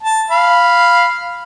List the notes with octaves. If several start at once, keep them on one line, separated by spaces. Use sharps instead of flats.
A5
F5 B5